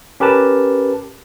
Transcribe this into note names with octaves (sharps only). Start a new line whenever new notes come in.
C#4 G4 A#4 B4 A5